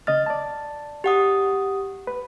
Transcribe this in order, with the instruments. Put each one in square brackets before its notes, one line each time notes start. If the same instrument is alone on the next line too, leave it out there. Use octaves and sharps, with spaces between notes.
[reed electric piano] C#3 D#5 F6 [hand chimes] A6
[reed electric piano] D5 A5
[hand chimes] G4 F#5 D#6
[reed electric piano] B4